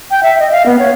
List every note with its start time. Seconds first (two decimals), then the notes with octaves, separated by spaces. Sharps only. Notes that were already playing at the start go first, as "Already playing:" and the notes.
0.11 G5
0.23 E5
0.39 D#5
0.52 F5
0.66 B3
0.79 C#5